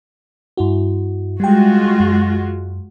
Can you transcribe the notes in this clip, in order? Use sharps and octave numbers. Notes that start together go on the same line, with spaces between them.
G2 E4 F#4
G3 G#3 F4 F#4 G5
F#2